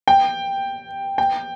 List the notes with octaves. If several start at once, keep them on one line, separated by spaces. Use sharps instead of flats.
G5
G5